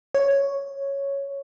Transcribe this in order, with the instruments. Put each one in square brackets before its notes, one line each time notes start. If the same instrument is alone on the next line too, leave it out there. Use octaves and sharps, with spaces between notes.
[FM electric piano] C#5